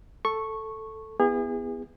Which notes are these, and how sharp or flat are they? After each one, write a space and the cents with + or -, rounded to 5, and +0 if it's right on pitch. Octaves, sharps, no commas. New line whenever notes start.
A4 +0 C#6 -10
B3 +0 E4 +5 G#4 -35